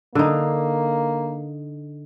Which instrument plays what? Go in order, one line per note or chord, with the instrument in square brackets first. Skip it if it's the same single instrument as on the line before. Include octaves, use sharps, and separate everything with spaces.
[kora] D3 D#4 [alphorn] A#3